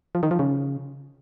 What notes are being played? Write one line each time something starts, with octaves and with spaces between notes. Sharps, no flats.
F3
D#3
F3
C#3